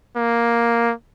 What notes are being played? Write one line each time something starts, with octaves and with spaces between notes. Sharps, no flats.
A#3